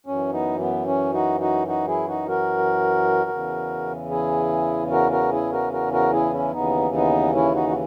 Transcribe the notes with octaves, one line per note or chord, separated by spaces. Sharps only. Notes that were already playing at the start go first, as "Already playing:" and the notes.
F#2 E3 C#4
B3 D#4
B3
C#4
D#4 F#4
D#4 F#4
D#4 F#4
E4 G#4
D#4 F#4
F#4 A#4
E2 C#3 E3
E4 G#4
F#4 A#4
F#4 A#4
E4 G#4
F#4 A#4
F#4 A#4
F#4 A#4
E4 G#4
C#4 E4
D#2 C#3 E3 B3 D#4
B3 D#4
C#4 E4
D#4 F#4
F#4